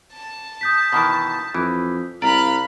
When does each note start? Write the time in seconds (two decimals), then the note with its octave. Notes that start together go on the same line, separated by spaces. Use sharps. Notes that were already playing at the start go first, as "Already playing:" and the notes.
0.13 A5
0.61 D#6 G6 B6
0.93 B2 D#3 E3
1.54 F2 E3
2.22 C2 D5 F5 A#5 B5 F#6